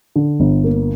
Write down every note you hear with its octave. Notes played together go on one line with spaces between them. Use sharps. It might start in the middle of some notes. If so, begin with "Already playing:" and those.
D3
G1
A#3